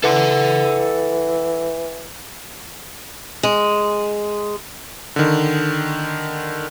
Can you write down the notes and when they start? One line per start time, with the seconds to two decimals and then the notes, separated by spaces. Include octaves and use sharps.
0.03 E3 A4 F#5
3.43 G#3
5.16 D3 D#3